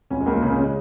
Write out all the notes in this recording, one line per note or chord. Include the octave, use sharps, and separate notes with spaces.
C#2 C#4
G#3
C#2 A#3
C#3 A#3
C#4
C#3 G#3